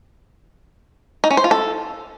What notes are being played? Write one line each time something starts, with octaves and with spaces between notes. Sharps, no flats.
D#4
C#4
C5
F4
A4